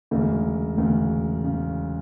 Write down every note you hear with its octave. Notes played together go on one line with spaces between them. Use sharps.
E1 D2 C#3
E1 D2 C#3
C#3